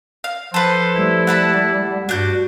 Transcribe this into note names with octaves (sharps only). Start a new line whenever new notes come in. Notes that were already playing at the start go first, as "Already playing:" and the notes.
F5
F3 A4 B4 C5
G3 A3 E4
F#5 A5 B5
G2 D4 F#4 G6